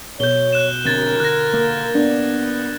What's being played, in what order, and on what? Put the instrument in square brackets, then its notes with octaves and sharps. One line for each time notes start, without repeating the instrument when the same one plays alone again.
[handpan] B2 [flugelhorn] C#5 [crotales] G6 G7
[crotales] F#6 E7
[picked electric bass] D3 C4 [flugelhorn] A#4 [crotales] G#6 A6 E7
[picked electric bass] D3 [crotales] F#6 A#6
[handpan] A#3
[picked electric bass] B3 [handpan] D4